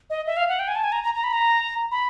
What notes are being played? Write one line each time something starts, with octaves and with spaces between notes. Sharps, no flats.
D#5
E5
F5
F#5
G5
G#5
A5
G#5
A#5
A#5
A#5
B5
A#5
B5